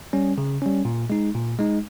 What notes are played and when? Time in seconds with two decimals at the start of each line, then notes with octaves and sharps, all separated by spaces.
0.13 G3 C#4
0.38 C#3
0.62 G3 C#4
0.85 A#2
1.10 G#3 D#4
1.34 A#2
1.59 G#3 D#4